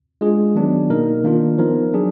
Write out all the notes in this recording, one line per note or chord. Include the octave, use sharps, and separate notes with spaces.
G#3 D4 F4 G#4
D#3 F#3 B3 D4
B2 A#3 D#4 A#4
D#3 A#3 D4 F4 A#4
F3 B3 D#4 A#4
F#3 D4 G#4